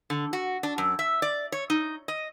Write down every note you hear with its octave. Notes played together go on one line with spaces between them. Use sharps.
D3
F#4
D4
F#2
E5
D5
C#5
D#4
D#5